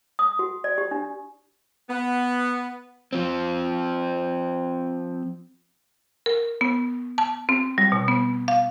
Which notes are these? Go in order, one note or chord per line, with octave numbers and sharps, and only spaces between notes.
D#6
F#4
D5
G4
D4
B3
F3 C4
A#4
B3
A5
C4
G3
B2
B3
F5